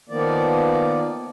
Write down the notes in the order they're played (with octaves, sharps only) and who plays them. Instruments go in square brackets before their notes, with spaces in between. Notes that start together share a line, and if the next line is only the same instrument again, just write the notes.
[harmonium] D#3 F3 A#3 B3 D5